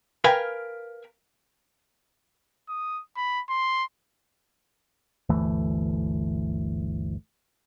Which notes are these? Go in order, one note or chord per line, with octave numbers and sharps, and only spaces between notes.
A#4 B4 F5 G5 G#5
D#6
B5
C6
G1 D2 E3 A3